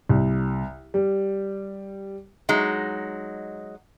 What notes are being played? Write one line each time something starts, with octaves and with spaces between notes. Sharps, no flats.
C2
G3
F#3 G#3 D#4